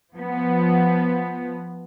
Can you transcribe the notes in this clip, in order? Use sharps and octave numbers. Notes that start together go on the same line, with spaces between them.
F3 B3